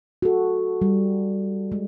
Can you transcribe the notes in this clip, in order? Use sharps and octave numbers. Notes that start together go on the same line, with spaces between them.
F#4 A4
G3
G#3